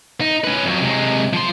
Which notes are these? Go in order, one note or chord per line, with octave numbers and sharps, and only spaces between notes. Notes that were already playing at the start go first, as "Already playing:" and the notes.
D#4
C#4 B4
F2 F#3
C3 G#3
F3 C6